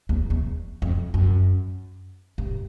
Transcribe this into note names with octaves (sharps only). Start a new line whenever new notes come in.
E2
E2
F2
F#2
G2